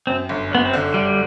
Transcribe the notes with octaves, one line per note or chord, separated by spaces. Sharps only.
F#2 C4
G1
F#2 B3
C4
D3
D3 G3